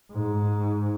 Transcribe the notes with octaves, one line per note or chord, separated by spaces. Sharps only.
G#2